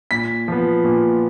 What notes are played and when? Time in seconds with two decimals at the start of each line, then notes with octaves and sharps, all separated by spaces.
0.11 A#2 B6
0.48 F3 B3
0.85 A#2